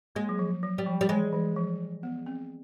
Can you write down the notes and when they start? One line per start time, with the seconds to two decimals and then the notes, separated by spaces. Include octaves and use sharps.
0.15 G#3 A#3
0.29 F#3
0.39 F3
0.63 F#3
0.78 G3
0.86 F3
1.01 G3
1.09 E3 G#3
1.33 E3
1.56 F3
2.03 B3
2.26 C4